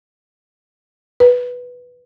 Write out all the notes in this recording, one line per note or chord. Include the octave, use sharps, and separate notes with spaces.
B4